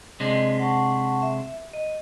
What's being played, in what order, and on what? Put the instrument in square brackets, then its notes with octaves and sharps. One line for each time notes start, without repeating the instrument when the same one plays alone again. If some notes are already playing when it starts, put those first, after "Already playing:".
[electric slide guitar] C3 G#3 D4 [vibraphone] D#5
[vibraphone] F#5 A5 C#6
E5
D#5